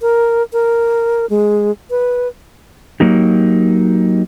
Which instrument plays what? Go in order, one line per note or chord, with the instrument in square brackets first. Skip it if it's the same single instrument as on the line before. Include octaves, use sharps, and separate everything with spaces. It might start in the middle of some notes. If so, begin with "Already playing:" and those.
[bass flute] A#4
A#4
G#3
B4
[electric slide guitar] F#3 A#3 D#4 G4